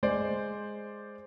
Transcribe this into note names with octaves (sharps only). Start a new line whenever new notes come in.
G#3 C5 D5